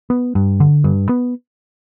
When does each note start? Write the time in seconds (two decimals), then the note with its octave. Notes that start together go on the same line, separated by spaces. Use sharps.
0.10 B3
0.35 G2
0.60 D3
0.84 G2
1.09 B3